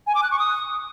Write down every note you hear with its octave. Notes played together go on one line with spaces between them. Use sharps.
G#5
D6
F#6
C#6
D#6